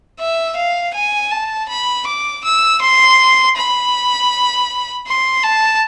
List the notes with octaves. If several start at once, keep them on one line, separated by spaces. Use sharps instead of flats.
E5
F5
G#5
A5
B5
D6
E6
C6
B5
C6
A5